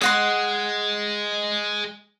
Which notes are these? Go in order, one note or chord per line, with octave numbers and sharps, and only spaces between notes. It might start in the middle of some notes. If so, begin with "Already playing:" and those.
G#3 D#5 F#5 C6